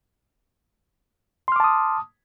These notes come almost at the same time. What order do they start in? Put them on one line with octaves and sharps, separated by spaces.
C6 F6 D6 A5 D#6